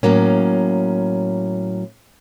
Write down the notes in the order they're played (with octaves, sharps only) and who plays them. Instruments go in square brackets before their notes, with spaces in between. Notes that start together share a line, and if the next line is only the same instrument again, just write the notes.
[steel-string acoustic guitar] A2 F#3 A#3 C#4